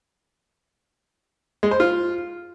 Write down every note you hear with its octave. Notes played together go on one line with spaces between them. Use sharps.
G#3
C5
F4